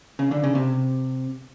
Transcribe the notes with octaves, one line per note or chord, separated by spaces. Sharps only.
C#3
D3
C#3
C3